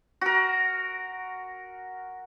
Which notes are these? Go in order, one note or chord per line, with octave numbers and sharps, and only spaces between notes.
F#4 A#4